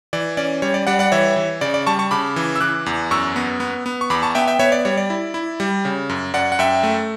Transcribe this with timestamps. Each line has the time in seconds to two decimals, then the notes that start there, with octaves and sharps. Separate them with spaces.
0.13 E3 D5
0.37 C#4 D5
0.62 G3 C#5
0.74 D5
0.87 G3 D5 F#5
0.99 D5 F#5
1.12 E3 C#5 E5
1.36 E3
1.61 C#3 D5
1.74 D5
1.86 G3 A5 C#6
1.99 A5 C#6
2.11 C#3 B5 D6
2.36 E3
2.56 E6
2.61 E3 D6 F#6
2.86 E2
3.11 F#2 C#6 E6
3.36 B3
3.60 B3
3.86 B3
4.01 C#6
4.10 E2 B5 D6
4.23 A5 C#6
4.35 B3 E5 G5
4.48 E5 G5
4.59 B3 C#5 E5
4.72 D5
4.85 G3 C#5
4.97 D5
5.10 E4
5.34 E4
5.60 G3
5.85 C#3
6.09 F#2
6.34 F#2 D5 F#5
6.52 F#5
6.59 F#2 E5 G5
6.83 A3